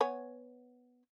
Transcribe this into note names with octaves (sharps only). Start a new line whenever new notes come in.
B3 C#5 G#5